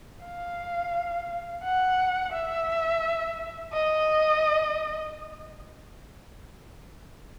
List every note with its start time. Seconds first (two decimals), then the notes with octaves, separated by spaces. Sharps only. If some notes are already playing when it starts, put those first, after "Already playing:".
0.25 F5
1.64 F#5
2.33 E5
3.73 D#5